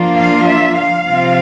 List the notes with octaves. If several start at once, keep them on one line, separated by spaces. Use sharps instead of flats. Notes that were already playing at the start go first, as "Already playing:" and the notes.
Already playing: F3 A#3 D4 F4
F5
E5
F5
C3 F3 C4 F4